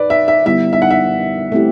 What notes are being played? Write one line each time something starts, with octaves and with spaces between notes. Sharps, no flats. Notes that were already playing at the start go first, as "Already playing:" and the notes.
Already playing: B4 D5
E5
E5
D3 G3 B3 E4 E5
E5
F#5
E5
A3 C4 E4 G4